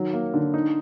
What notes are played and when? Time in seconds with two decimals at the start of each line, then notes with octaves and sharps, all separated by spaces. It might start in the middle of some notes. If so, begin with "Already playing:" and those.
Already playing: D#3 F#3
0.13 A#3
0.34 D3
0.54 D#4